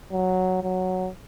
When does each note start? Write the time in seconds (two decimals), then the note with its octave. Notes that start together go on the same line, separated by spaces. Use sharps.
0.12 F#3
0.63 F#3